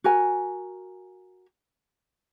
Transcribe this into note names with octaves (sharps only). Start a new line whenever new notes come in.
F#4 A#4 G#5